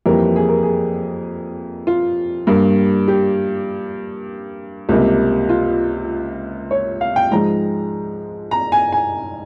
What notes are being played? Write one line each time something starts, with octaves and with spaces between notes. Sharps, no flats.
F2 E3 G3 A#3 A#4
G#4
A#4
G#4
F4
G2 G3 A#3
G4
C#2 C3 G3 A#3
F4
C#5
F5
G5
G#2 F3 G#3 A#5
A#5
G#5
G#5